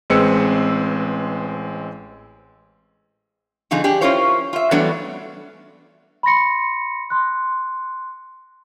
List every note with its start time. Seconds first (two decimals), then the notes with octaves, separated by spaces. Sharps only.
0.10 A1 G#3 C4 B4 E6 C#7
3.71 B2 D3 F3 D#4 G#4
3.84 D4 G4 G#4 D5
4.01 C#4 E4 F4 A#4 C5 C#5
4.53 F4 E5
4.71 E3 F#3 G3 A3 B3 D4
6.23 B5 C6 A#6 C#7
7.10 C6 F#6